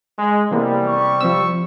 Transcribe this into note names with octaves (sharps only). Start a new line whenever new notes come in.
G#3
C3 E3 G3 A#3 B3
C#6
F3 C4 E6